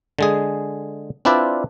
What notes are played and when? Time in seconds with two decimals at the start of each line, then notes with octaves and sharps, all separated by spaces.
0.19 D3 G#3 G#4
1.25 C4 D4 E4 F4 B4 D5